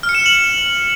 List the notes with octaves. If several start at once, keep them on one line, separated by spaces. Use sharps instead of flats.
F6
C#7
E7
C#7
F#7